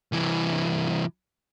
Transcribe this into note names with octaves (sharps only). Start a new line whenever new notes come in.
C2 E3